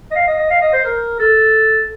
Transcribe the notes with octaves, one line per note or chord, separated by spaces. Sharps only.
D#5
F5
D#5
D#5
F5
D#5
C5
A#4
A4